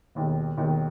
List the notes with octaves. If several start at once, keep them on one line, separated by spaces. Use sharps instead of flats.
E1 D#2 D#3
E1 D#2 D#3